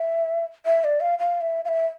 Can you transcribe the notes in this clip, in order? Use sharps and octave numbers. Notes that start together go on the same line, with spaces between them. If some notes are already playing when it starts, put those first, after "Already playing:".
Already playing: E5
E5
D5
F5
F5
E5
F5
E5